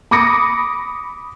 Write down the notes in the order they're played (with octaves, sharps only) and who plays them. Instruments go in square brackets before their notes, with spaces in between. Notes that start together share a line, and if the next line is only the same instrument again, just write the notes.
[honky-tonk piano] B5 D6 D#6 A#6 C#7